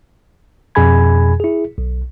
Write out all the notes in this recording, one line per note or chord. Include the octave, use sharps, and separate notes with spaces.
F2 B2 G#4 G#5 B5 G#6
E4 G#4
B1